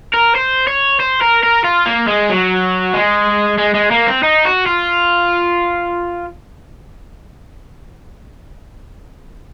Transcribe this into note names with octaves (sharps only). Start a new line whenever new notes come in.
A#4
C5
C#5
C5
A#4
A#4
F4
A#3
G#3
F#3
G#3
G#3
G#3
A#3
C4
D#4
F#4
F4